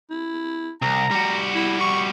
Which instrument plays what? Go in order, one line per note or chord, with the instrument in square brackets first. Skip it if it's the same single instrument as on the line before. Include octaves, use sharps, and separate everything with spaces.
[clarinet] E4
[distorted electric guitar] C2 [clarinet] A#5
[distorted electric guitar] G3 F#4
[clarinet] E4
C#6